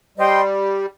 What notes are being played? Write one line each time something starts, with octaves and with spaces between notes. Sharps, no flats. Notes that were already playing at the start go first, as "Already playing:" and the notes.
G3 C5 D#5 G5 C6